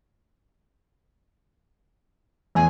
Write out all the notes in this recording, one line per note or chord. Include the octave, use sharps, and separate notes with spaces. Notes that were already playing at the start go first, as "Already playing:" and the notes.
E2 G#5